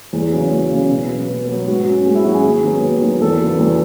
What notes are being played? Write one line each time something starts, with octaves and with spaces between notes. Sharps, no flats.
E2 G#4
C#3 F#3 C#4
E2
C#3 F#3 C#4
B2
F#3 B3
B2
F#3 B3
G#2 F#4
F#3 C#4
G#2 G#4
E4
F#3 C#4 F#4
G#4
D#2
D#3 F#3 B3
D#2
D#3 F#3 B3
E2 A4
C#3 F#3 B3
E2